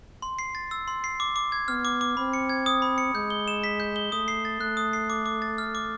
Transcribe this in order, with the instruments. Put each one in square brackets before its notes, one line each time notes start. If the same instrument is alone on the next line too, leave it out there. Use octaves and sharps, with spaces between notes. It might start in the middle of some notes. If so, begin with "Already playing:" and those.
[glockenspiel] C6
C7
A6
E6
C6
C7
D6
D6
G#6
[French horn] B3 [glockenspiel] F6
[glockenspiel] D6
D6
[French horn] C4 [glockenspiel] B5
[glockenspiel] C#7
G#6
D#6
B5
C#7
[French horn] G#3 [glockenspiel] G6
[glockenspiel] G7
E7
B6
G6
G7
[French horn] A3 [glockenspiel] D#6
[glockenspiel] C7
A6
[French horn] A3 [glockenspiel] F#6
[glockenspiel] D#6
C7
D6
D6
A6
F6
D6